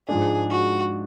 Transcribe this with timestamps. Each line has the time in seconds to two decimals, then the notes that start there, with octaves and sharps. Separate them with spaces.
0.08 G#2 F3 G#3 D4 G#4
0.51 F#4